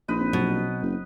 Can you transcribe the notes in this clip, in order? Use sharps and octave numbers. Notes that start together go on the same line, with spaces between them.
A#1 D#4 B4
C4
B2 F#3
F#1